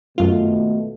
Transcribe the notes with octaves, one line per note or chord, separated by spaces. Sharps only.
G#1 F#2 B2 A3 F4